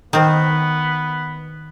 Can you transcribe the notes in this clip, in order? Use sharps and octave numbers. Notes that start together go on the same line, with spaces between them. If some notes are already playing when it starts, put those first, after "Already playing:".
D#3 B3 C4